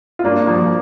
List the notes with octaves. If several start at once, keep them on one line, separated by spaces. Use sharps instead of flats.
F4
G2 A#3 D4
F3 A#3
F3